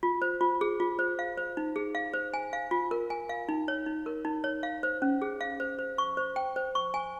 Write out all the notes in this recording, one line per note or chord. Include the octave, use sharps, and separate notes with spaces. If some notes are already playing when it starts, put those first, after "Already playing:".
F4
C5
F4
G#4
F4
C5
F5
C5
D#4
G#4
F5
C5
G#5
F5
F4
A#4
G#5
F5
D#4
C#5
D#4
A#4
D#4
C#5
F5
C5
C#4
G#4
F5
C5
C5
C#6
C5
G5
C5
C#6
G#5